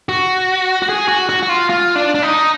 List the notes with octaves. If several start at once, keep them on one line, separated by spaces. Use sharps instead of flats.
F#4
F#4
G#4
F#4
F#4
F#4
F4
F4
D4
D4
D#4